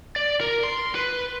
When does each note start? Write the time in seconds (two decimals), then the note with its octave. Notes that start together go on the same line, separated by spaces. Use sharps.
0.16 D5
0.41 A#4
0.64 C6
0.95 B4